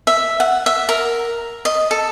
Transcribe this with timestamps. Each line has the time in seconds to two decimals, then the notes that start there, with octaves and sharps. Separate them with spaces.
0.07 E5
0.40 F#5
0.66 E5
0.89 A#4
1.65 D#5
1.91 A4